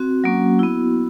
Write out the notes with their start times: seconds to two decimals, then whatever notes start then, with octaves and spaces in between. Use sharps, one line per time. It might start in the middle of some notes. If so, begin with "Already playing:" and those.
Already playing: C4 F#4
0.24 F#3 A#3 C#4
0.59 B3 E4